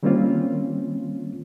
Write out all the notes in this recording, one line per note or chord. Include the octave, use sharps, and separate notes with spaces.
D#3 G3 A#3 C4 C#4 F4